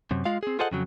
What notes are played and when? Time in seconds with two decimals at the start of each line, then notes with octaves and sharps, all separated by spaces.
0.11 F#2 C3
0.25 G#3 F4 F5
0.43 C4 G#4
0.59 F4 G#4 A4 C5 D#5 F#5
0.72 F2 C#3 F#3